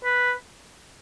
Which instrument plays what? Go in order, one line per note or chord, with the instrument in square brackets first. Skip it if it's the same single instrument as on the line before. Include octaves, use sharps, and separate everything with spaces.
[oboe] B4